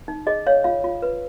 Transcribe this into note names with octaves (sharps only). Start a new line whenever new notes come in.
D#4
G#4 D#5
C#5 F5
F4 F5
F4
B4